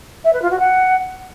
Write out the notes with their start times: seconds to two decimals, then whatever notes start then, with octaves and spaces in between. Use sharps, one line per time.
0.24 E5
0.33 B4
0.41 F4
0.50 F#4
0.59 F#5